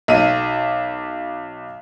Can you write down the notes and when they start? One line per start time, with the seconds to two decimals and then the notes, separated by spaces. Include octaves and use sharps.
0.08 B1 D#7